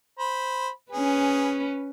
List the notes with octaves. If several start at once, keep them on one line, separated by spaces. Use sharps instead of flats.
C5 B5
C#4 G#4 B4